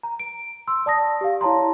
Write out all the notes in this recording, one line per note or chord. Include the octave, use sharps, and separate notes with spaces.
A#5
D7
C6 E6
D5 A5 D#6 A#6
G4 F5
E4 C#5 A5 A#5 C6